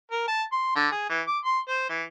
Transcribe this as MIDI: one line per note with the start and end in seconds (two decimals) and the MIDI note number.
0.12 0.26 70
0.28 0.43 81
0.52 0.73 84
0.76 0.88 50
0.92 1.09 68
1.10 1.22 52
1.27 1.39 86
1.45 1.59 84
1.69 1.89 72
1.90 2.04 52